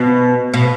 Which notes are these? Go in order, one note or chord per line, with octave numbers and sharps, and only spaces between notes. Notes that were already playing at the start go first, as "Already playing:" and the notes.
Already playing: B2
B2